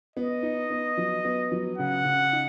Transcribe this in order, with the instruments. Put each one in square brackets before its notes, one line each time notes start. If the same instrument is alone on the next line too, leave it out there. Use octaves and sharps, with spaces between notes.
[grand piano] B3 [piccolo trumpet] D#5
[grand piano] D#4
B3
F#3
B3
F#3
[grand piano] C#3 [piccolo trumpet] F#5
[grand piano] C#3
D#4